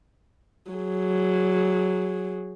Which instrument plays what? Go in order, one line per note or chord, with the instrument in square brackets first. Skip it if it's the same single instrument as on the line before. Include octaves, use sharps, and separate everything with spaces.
[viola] F#3 G#4